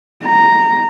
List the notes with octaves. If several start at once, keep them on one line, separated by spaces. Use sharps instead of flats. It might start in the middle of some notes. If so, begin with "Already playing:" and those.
A#5